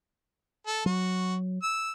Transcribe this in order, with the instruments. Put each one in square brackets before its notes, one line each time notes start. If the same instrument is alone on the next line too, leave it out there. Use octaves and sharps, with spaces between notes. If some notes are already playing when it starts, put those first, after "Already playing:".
[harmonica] A4
[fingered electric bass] F#3 [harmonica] F#4
[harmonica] E6